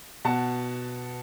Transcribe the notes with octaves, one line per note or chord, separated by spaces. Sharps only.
B2 F#5 A5